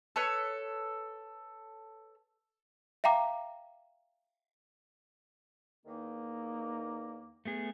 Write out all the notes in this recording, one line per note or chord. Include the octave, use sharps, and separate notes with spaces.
A4 B4 C#5
E5 F5 G5 A#5 D6
E2 D#3 A#3 D#4
A3 B3 G#4